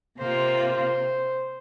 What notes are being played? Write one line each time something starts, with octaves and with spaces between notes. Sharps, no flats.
C3 A#3 F4 C5
C5